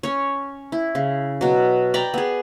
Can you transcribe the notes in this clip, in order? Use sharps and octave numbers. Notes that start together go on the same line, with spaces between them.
C#4 C#5
E4
C#3
B2 F#3
D5 G5 A#5 B5
B3 G#4